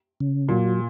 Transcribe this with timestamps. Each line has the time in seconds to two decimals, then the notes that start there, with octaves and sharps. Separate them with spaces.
0.20 C#3
0.48 A#2 F#3